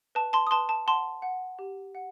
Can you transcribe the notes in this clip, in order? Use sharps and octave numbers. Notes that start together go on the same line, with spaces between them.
B4 A5
A5 C6
D#6
B4 A5 C6
A5
F#5 A5 C6
F#5
G4
F#5